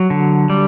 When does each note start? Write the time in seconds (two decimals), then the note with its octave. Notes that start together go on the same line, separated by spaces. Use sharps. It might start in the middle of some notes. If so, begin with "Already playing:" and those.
Already playing: F#3
0.10 D3
0.50 G3